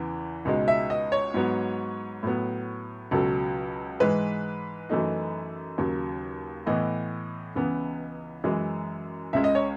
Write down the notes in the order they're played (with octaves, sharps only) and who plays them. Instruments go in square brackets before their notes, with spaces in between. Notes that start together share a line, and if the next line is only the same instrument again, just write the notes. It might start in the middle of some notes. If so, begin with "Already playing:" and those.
Already playing: [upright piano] E2 C#3 E3 B3 E4
C#2 B2 G#3 D#4
E5
D#5
C#5
G#2 F#3 B3
A2 F#3 B3
C#2 B2 F#3 A4
G#2 E3 G#3 B4
F#2 E3 A3 D#4
D#2 C#3 F#3
A2 E3 B3 D#5
C#2 C#3 E3 B3
F#2 E3 G#3
C#2 C#3 G#3 E5
D#5
C#5